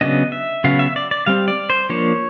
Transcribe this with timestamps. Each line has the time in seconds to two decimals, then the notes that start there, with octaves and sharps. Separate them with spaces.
0.01 C#3 F#3 B3 D4 D#5
0.32 E5
0.64 C#3 F#3 B3 F5
0.79 E5
0.96 D5
1.11 D5
1.26 G3 C4 F5
1.48 D5
1.70 C5
1.89 F3 A#3 D4 C#5